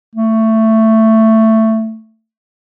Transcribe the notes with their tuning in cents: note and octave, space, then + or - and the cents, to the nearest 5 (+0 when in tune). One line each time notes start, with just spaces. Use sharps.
A3 +10